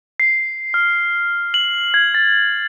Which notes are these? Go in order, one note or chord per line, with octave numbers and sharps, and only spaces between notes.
C7
F6
F#7
G#6
A6